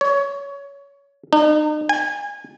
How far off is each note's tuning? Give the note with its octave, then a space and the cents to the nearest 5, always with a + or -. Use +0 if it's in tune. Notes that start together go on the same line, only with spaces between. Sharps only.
C#5 +20
D#4 -40
G#5 -25